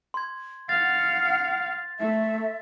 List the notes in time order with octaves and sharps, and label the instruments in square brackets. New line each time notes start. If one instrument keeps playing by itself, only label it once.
[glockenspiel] C6 G#6
[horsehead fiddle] F5 [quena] F#5 [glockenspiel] A6
[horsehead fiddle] A3 [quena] E5